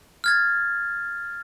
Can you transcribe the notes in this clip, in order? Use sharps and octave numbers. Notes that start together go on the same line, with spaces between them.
F6 G#6 A6